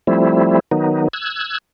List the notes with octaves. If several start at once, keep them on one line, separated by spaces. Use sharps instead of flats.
F3 G3 A3 C4 E4
D#3 F#3 B3 D#4
E6 F#6 G#6